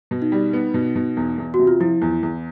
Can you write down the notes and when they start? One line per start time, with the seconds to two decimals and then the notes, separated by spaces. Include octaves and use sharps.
0.11 B2
0.22 D#4
0.32 G3
0.53 B3
0.74 B2
0.96 B2
1.17 E2
1.38 E2
1.54 F#4
1.59 C3
1.67 F4
1.80 F3 E4
2.02 E2
2.23 E2